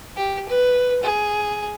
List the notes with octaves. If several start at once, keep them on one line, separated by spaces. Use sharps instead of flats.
G4
B4
G#4